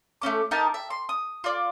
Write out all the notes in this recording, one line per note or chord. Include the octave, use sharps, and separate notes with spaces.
A3 C4 C#4 D6
D#4 G4 A#4 A5
E5
C6
D#6
F4 D5